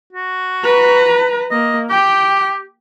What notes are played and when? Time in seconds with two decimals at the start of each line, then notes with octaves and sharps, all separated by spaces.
0.13 F#4
0.64 B4 A#5
1.51 A#3 D#5
1.90 G4 G5